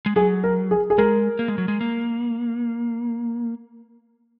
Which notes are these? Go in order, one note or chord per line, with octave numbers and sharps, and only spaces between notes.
G#3
F#3 G#4
A#4
G#4
G#4
G#3 A#4
A#3
G#3
F#3
G#3
A#3